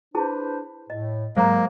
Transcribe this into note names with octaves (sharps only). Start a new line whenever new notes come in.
D4 E4 G#4 B4 C5 A5
A2 D#5
G#2 F#3 G#3 A#3 C5 A#5